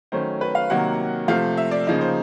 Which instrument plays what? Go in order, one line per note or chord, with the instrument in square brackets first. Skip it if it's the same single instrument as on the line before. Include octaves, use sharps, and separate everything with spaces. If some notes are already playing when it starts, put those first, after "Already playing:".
[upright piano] D#3 F#3 A3 C#4 C5
B4
F5
C3 D#3 F#3 A#3 F#5
C3 F3 A3 F5
E5
D5
C#3 F3 A#3 D#4
C5